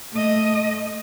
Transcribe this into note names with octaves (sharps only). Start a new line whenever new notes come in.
A3 D#5